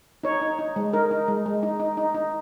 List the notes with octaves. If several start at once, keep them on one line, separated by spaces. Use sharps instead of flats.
D#4 C#5
D#4
D#4
G#3
D#4 A#4
D#4
G#3
G#3
D#4
D#4
D#4
D#4